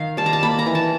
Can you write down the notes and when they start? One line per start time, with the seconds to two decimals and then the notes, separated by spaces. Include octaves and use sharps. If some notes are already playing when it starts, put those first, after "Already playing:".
Already playing: D#3 F5
0.17 G3 A5
0.26 A#5
0.33 A5
0.43 A#3 B5
0.59 A#5
0.66 E3
0.75 A5